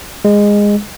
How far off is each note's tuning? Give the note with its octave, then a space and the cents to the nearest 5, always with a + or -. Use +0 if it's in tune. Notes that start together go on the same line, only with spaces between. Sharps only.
G#3 -15